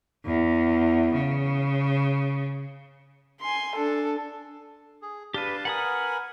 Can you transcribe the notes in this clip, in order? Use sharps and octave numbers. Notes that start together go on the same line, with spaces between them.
E2
C#3
G#5 C6
D4 A4
G#4
D4 G4 B4 F5 A5
A#4 B4 F#5 G#5 B5 D#6